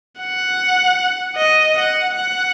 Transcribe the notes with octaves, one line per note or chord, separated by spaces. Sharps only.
F#5
D#5
F#5
F#5